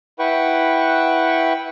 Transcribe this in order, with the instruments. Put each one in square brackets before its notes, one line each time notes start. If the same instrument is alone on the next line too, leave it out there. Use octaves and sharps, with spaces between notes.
[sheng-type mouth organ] E4 B4 F#5 G5 C#6